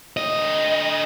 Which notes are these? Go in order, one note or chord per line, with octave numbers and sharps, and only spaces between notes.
D3 D#5